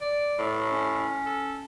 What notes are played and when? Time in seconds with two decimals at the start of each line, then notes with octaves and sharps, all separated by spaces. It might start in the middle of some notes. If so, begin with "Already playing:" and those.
0.01 D5
0.39 A2
0.71 C#4
1.26 A4